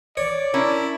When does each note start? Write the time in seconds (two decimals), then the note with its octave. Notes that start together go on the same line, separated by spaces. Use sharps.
0.17 C#5 D5
0.54 C#4 D4 E4 A#4